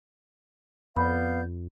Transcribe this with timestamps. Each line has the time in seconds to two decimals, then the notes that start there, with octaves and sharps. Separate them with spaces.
0.96 F2 B3 D5 F5 B5 G6